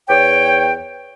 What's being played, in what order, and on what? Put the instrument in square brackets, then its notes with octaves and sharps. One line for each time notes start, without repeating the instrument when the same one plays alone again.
[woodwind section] E2 C#5 G5